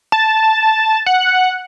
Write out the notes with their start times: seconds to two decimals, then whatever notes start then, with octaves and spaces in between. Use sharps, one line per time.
0.12 A5
1.06 F#5